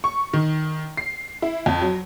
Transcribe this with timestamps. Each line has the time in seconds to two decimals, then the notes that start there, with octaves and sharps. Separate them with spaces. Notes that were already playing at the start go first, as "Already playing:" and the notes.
0.04 C#6
0.33 D#3
0.97 C7
1.42 E4
1.66 F2
1.81 F#3